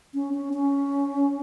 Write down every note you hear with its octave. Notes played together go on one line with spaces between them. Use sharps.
C#4
C#4
C#4